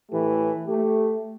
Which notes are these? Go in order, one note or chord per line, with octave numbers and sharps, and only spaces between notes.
A2 E3 A3 G4
A3 G4